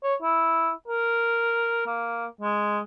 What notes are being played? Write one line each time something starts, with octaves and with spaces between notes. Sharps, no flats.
C#5
E4
A#4
A#3
G#3